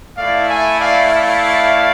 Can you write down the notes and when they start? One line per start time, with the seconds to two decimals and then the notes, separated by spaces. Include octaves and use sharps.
0.17 A3 E4 D5 F5
0.48 E5 G#5
0.79 D5 F5
1.10 D5 F5